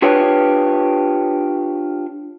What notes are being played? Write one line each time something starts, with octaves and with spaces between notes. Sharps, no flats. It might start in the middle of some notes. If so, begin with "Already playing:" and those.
D4 F4 G4 B4 C#5